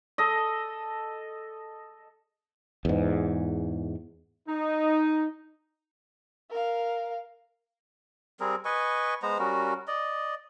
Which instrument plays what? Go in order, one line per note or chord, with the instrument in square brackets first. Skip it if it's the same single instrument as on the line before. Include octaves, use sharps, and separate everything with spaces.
[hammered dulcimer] A4 D#5
[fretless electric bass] E2 G#2
[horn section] D#4
[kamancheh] A#4 F5
[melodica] G3 C4 G#4 A#4
B4 D#5 G#5 C#6
G#3 B3 C5 A#5
G3 C#4 F#4 A#4
D5 D#5